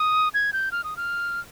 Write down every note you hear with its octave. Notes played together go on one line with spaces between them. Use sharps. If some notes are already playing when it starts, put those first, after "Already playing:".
Already playing: D#6
G#6
G6
F6
D#6
F6